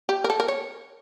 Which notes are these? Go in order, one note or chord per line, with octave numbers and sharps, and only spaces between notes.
G4
A#4
A4
A#4
C#5